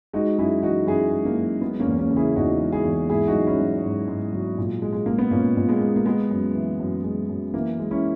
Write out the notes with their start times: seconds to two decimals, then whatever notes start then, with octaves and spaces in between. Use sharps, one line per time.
0.13 G#3 D#4 F#4
0.38 F#2 E4 G#4
0.62 E3 D#4 F#4
0.87 F#2 E4 G#4
1.12 G#3
1.25 A#3
1.36 F#2
1.61 G#3 B3
1.79 A#3 C#4
1.86 E2
1.99 A#3 C#4
2.11 C#3
2.17 E4 G#4
2.36 E2 D#4 F#4
2.60 G#3
2.72 E4 G#4
2.85 E2
3.10 G#2 E4 G#4
3.28 D#4 F#4
3.34 F#3
3.47 C#4 E4
3.60 F#3
3.84 G#2
4.08 G#2
4.33 F#3
4.58 A#2
4.82 G#3
4.93 G#3
5.06 G#3 A#3
5.19 B3
5.31 A#2 A#3 C#4
5.57 A#2
5.69 G#3 B3
5.81 G#3
5.96 A#3
6.06 G#3 B3
6.31 F#2
6.55 E3
6.80 F#2
7.04 G#3
7.29 F#2
7.53 E3 A#3
7.79 G#3
7.91 C#4 E4